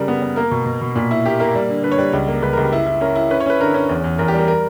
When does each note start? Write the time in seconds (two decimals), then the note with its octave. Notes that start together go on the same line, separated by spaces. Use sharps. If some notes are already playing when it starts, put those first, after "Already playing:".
Already playing: C#3 G3 A#4
0.08 B3
0.22 B3
0.36 A#3 A#4
0.51 B2
0.66 B2
0.81 B2
0.95 A#2
1.11 E4
1.25 A#3 G4
1.39 A#3 A#4
1.55 G3
1.69 D3
1.83 D3 B4
1.92 C#5
1.98 G3 B4
2.13 C#2
2.28 A#3
2.42 C#2 B4
2.53 A#4
2.57 C#2 G4
2.73 E4
2.87 E4
3.01 C#4 A#4
3.15 E4
3.30 C#4 B4
3.40 C#5
3.46 C#4 B4
3.60 D3 A#4
3.74 C#4
3.89 E2
4.04 E2
4.18 E2 A#4
4.28 G4
4.34 G3 A#4
4.48 A#4